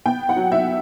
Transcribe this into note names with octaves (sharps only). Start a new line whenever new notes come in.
B3 G5
F#5
F#3
E5